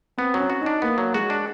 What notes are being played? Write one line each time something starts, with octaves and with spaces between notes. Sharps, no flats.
B3 C4
F#3
C#4
F#4
D#4
D4
A#3 B3
F#3
G#3 F#4
D4